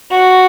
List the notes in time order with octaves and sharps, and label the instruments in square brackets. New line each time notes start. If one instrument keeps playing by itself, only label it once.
[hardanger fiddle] F#4